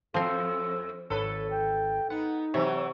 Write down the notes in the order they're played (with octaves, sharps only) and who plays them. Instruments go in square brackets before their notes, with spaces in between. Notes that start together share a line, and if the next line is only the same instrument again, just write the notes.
[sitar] F2 [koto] F3 C4 [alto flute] A4 [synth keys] C5
[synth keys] G#1 [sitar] A4 B4 [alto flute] C#5
[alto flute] G5
[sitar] B3 [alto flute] D#4 [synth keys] F#5
[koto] C3 [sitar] E3 F#3 [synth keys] C#5